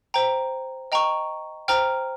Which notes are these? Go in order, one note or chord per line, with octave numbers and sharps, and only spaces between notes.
C5 G5 A#5
D#5 G5 A#5 C#6
C5 G5 A#5 F6